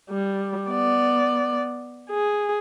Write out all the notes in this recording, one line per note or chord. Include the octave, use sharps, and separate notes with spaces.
G3
B3 D5
G#4